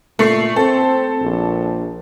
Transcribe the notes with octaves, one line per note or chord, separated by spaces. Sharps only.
A#2 A3 C#6 C7
C4 A4
A#1